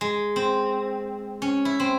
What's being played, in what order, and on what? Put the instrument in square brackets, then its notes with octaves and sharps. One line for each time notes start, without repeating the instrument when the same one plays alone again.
[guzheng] G#3
C4
C#4
E4
C4